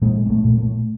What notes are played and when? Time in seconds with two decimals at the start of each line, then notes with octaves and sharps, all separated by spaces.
0.02 A#2 G#3
0.26 A#3
0.30 A3
0.45 A#2
0.58 A3